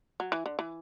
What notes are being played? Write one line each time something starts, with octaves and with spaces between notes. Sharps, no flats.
F#3
E3
D3
E3